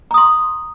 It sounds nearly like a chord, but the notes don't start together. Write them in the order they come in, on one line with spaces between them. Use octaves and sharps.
A#5 D#6 C6